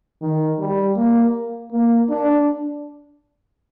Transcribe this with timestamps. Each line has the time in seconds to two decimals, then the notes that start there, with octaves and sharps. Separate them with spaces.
0.22 D#3
0.59 G3
0.97 A#3
1.72 A#3
2.09 D4